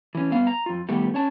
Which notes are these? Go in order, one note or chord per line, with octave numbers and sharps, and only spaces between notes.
E3 C#4
G2 B3 F5
A#5
F2 F4
A2 D#3 G3 A3 B3 G4
C#4 C#5 A5